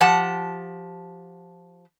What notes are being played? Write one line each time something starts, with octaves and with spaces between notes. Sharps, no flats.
F3 G4 F#5 A5